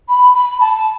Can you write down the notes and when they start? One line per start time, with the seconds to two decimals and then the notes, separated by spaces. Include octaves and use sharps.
0.08 B5
0.34 B5
0.60 A5